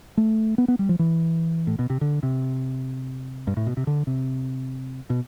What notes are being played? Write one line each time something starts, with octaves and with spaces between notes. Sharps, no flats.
A3
B3
B3
G3
F3
E3
A2
B2
C3
D3
C3
G2
A2
B2
C3
D3
C3
B2